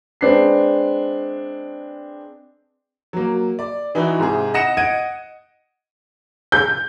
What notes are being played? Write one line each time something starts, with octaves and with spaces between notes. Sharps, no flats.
G#3 C4 D4 B4 C7
F#3 A#3
D5
E3 D#4 E4 F#4
G#2 C3 G#4
D#5 F#5 A#6 C#7 E7
D#5 F#5 G#6 D7 D#7
G6